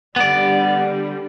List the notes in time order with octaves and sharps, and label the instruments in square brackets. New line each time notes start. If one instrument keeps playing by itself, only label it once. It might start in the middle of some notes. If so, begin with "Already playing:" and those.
[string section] D3 G3 [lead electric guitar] B3 D5